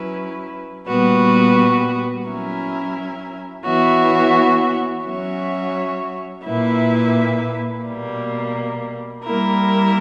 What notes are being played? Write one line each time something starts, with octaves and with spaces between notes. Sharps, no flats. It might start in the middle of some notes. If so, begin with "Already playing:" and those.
Already playing: F#3 C#4 E4 B4
A#2 G3 B3 F#4 B4
F#3 C#4 E4 A#4 E5
E3 B3 F#4 C#5 E5
F#3 C#4 F#4 C#5 E5
A#2 A#3 E4 B4 E5
B2 G3 A#3
G3 A#3 E4 A#4